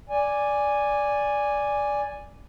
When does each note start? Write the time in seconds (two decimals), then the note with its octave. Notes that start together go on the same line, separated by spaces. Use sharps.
0.10 D5 G#5